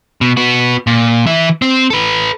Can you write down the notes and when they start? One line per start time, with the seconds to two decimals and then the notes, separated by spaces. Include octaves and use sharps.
0.21 B2
0.37 B3 F#4
0.87 A#2
1.27 E3 E5
1.62 C4
1.90 A4 B4